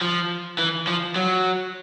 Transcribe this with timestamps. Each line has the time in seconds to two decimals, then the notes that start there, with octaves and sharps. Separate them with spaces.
0.01 F3
0.59 E3
0.87 F3
1.16 F#3